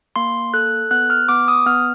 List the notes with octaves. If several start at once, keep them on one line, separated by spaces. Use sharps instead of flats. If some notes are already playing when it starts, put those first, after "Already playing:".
A#3 C6
A4 F#6
B3 F#6
F6
B3 D6
D#6
B3 F6